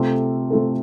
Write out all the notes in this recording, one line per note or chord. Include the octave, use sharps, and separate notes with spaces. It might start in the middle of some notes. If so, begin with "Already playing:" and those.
Already playing: C3 A3 F4 A4
C3 A3 F4 A4